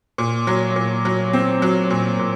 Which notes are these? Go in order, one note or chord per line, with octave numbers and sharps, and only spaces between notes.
A#2
F#3
A#2
F#3
C4
F#3
A#2
A#2